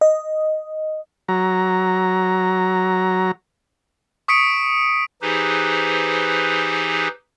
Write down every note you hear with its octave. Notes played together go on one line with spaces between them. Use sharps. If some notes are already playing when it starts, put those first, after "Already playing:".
D#5
F#3 A#5
C#6 D#6 B6 C#7 D7
E3 D#4 G4 G#4 B4 C5